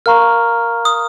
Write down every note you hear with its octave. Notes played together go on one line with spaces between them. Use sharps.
A#4 F5 A#5 C#6 F6
D#6